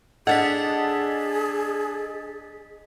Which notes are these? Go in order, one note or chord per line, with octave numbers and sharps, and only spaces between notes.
D4 G#4 A4 D#5 F5 F#5 A6 B6